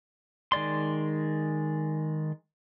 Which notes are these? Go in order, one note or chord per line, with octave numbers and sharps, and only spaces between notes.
D#3 G#3 D5 C6